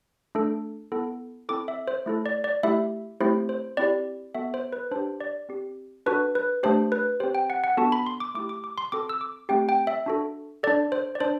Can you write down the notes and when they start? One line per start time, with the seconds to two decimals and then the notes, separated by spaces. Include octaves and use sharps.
0.35 A3 D4 A4
0.92 B3 E4 A4
1.49 C4 E4 A4 D6
1.68 E5
1.88 C5
2.06 A3 E4 A4
2.26 D5
2.44 D5
2.63 A3 E4 G4 E5
3.21 A3 C4 E4 G4 C5
3.49 C5
3.77 C4 E4 G4 D5
4.35 B3 F#4 A4 E5
4.54 C5
4.73 B4
4.91 D4 G4 C5
5.20 D5
5.49 C4 G4
6.06 D4 F#4 A4 B4
6.35 B4
6.63 A3 D4 G4 C5
6.92 B4
7.20 C4 G4 C5
7.35 G5
7.50 F#5
7.64 F#5
7.77 B3 D4 F#4 A4 A5
7.92 B5
8.06 C6
8.20 D6
8.34 A3 E4 G4 D6
8.49 D6
8.64 D6
8.78 C6
8.92 C4 F#4 A4 D6
9.09 E6
9.21 D6
9.49 A3 C4 G4 G5
9.69 G5
9.87 E5
10.06 D4 F#4 A4
10.63 D4 A4 D5
10.92 C5
11.15 D5
11.20 D4 C5